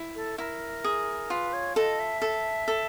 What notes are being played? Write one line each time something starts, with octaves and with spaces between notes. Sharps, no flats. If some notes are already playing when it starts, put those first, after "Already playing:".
Already playing: E4
A4
E4 A#4
G#4
F4 B4
C#5
A4 D#5
E5
A4
A4